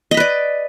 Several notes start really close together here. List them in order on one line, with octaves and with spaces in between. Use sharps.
D#5 B5 B4 D5